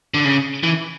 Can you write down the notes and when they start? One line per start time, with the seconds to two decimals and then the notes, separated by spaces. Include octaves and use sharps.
0.14 D3
0.25 C#3
0.63 E3